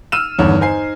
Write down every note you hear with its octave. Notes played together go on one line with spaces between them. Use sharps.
E6 F6 D#7 E7
E2 G2 D3 D#3 C#5
D#4 C5 G#5 C7